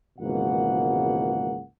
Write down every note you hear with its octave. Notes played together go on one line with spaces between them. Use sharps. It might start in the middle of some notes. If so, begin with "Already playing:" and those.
G#1 C#2 B2 E3 A#3 F#5